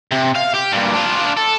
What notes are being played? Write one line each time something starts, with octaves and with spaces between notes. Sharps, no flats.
C3
F5
G4
G2 A#2
D4 F4
A4